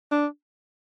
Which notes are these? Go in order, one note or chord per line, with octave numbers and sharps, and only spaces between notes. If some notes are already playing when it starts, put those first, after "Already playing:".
D4